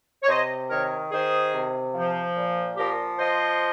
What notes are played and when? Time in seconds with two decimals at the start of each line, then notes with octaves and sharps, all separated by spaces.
0.23 C#5
0.28 C3 C5 D#5
0.69 D#3 A#4 C#5
1.11 D#3 G#4 C5
1.52 C3
1.95 F3
2.35 A#2
2.77 F3 G4 A#4
3.18 F3 C5 D#5